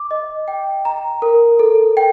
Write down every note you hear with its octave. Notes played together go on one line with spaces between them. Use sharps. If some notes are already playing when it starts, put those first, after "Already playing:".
Already playing: D6
D#5
G5
A#5
A#4
A4
G5